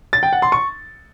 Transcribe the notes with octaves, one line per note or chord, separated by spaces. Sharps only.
A6
G5
F#5
C6
C#6